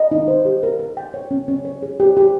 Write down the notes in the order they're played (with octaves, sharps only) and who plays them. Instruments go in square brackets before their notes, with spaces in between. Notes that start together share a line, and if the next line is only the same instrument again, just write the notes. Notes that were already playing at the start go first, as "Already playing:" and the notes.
Already playing: [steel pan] D#5
D#4
C5
G4
A#4
A#4
G5
C#5
C#4
C#4
C#5
G#4
G4
G4